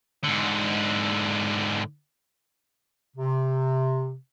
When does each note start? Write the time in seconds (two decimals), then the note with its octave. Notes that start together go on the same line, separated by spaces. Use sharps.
0.24 G#2 D3
3.17 C3